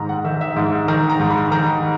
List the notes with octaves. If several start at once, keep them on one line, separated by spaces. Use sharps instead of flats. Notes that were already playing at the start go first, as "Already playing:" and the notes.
Already playing: G#2 D#3 A#5
F#5
D#3 E5
E5
G#2
D#3 A#5
A#5
G#2
B5
D#3 A#5